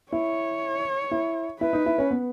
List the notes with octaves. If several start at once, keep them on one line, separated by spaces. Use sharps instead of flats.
E4 C#5
E4
E4 B4
D#4
E4
C#4
B3